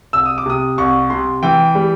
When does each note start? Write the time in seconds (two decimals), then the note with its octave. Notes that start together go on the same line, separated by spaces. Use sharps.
0.13 C2 E6
0.26 D#6
0.38 D6
0.46 C3 D#6
0.78 C2 C#6
1.10 C3 C6
1.43 E3 G5
1.75 G3